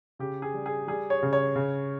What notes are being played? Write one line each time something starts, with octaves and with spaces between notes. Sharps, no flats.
C#3 G4
G#4
G3
G#4
G3 G#4
C#5
C#3
C#5
C#3